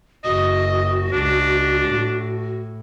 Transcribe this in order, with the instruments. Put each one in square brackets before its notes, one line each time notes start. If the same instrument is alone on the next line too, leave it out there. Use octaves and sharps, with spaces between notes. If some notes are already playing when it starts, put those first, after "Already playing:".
[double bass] F#1 [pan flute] F#4 [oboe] D#5
[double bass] C#2 [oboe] D4
[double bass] A2